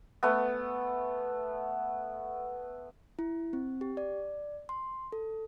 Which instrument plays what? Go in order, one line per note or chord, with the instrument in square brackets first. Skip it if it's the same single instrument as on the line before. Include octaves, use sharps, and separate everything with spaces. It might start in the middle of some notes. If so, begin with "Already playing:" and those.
[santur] A3 B3
[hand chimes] E4
C4
G4
D5
C6
A4